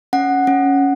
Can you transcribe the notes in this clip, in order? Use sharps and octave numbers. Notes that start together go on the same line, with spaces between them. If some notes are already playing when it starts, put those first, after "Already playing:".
C#4 F#5
C#4